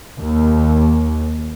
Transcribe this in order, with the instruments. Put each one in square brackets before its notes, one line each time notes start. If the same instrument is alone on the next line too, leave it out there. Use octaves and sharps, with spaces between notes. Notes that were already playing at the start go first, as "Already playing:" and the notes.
[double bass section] D#2